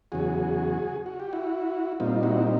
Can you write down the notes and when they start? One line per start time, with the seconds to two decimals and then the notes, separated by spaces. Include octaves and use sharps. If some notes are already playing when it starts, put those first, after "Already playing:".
0.12 E2 C#3 F#3 F#4 G#4
1.06 F#4
1.20 G4
1.33 E4 F#4
2.00 A#2 G3 C4 D#4 F4
2.23 E4 F#4